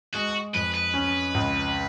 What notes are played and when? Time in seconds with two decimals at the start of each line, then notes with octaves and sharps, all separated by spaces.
0.14 G#3 F#4
0.54 F2 B4
0.74 B4
0.94 C#4
1.34 C#2